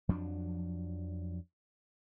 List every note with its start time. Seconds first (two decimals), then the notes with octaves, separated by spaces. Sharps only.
0.09 F2 F3 F#3 D4